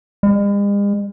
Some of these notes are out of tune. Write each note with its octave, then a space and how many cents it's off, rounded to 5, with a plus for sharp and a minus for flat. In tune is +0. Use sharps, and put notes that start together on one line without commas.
G#3 -45